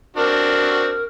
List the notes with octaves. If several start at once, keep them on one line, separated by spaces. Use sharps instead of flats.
C4 D4 F#4 A#4